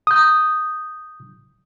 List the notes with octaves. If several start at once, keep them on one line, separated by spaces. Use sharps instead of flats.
D#6 G6